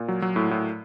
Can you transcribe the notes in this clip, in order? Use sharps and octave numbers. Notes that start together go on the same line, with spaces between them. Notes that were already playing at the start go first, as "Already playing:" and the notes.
Already playing: A#2
F#3
F#3
A2
A2